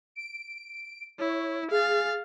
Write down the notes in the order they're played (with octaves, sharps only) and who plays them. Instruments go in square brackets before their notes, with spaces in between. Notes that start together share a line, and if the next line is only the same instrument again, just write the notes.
[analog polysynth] D7
[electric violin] E4 [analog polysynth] C#5
[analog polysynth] G#4 A6 [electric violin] F5